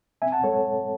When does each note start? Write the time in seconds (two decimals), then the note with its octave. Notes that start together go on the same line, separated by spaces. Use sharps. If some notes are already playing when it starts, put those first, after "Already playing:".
0.22 C4 E5 G#5
0.32 F#5 A5
0.44 G#3 A4 C#5